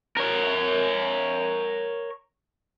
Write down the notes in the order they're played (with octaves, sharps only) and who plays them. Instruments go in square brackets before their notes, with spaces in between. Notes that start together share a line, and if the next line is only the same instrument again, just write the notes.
[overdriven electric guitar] A#4 C#5